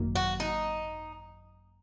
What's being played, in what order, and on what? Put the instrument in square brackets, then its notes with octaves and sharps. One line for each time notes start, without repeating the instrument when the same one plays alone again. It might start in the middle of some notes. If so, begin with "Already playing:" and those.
Already playing: [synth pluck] G#1 F#2 D#3 F#3 A#3
[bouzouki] F#4
D#4